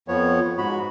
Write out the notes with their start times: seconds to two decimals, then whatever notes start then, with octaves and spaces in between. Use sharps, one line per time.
0.08 F2 F3 B3 C#5
0.58 G#2 F#4 B5